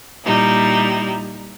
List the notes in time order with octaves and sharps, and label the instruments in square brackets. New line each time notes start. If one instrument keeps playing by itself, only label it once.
[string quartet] A#2 G3 D#4 E4